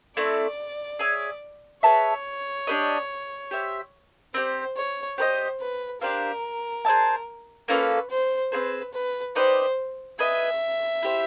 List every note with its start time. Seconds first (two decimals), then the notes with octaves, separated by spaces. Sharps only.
0.17 A3 C4 E4 D5
0.99 G#4 C#5 E5 G#5
1.83 G#4 B4 C#5 E5 A5
2.67 D4 G4 B4 D#5
3.51 G4 C5 E5
4.34 C4 D#4 G4 C5
4.76 C#5
5.18 G4 B4 C5 D#5
5.60 B4
6.01 D4 G4 A#4 C5 F5
6.85 G#4 C5 E5 A5
7.68 A#3 C#4 F4 A4 B4
8.10 C5
8.52 C4 D#4 G#4 B4 C5
8.93 B4
9.36 D#4 G4 B4 C5 D5
10.19 G#4 B4 D#5 E5
11.03 E4 G4 C5